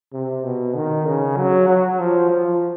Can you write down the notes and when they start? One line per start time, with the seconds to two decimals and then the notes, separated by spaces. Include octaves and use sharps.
0.13 C3
0.44 B2
0.75 D#3
1.06 C#3
1.37 F#3
1.68 F#3
1.99 F3
2.30 F3